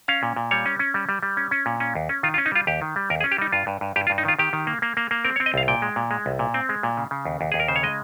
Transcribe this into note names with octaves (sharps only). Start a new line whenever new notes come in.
C#4 F5
A#2
A#2
G3 C#5
C#4
C#4
G3
G3
G3
C#4
C#4
A#2
C#4
D#2
C#4
D#3 F4
F4
C#4
D#4
G3 F4
D#2 G4
D#3
G3
D#2 A#4
G#4
C#4
G4
G3 D#4
G2 F4
G2
G2
G2 G4
F4
G2
D#4
D#3 F4
D#3 G4
D#3
A#3
A#3
A#3
A#3
C4 A#4
C#5
C4
D#5
C2 F5
A#2 G5
G#3
A#2
G#3
C2
A#2
C4
G#3
A#2
C#3
C#3
D#2
D#2
D#2 G#4
A#4
C#3 C5
C#5
G#3 D#5